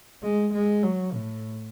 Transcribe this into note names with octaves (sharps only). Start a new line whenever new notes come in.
G#3
G#3
F#3
A2